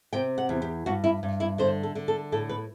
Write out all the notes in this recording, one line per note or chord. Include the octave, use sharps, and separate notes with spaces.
C3 G5
F#5
E2
G4
G2 F#4
E4
G2
E4
D3 C5
A4
D3
A4
A2 A4
B4